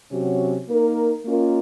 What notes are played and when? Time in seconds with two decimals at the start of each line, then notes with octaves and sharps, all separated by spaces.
0.10 C3 F#3 C#4 F#4
0.68 A#3 D#4 A#4
1.25 A#3 C#4 F4 A#4 D#5